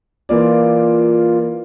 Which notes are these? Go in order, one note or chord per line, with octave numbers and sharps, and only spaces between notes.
E3 A#3 F4 D5